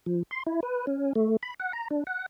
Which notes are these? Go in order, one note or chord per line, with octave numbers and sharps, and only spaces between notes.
F3
C6
E4
B4
C#4
A3
B5
F#5
A#5
D4
F#5